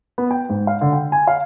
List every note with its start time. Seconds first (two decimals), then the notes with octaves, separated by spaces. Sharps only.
0.18 B3
0.31 G5
0.49 G#2
0.67 F5
0.81 D3
0.93 G5
1.12 G#5
1.27 F5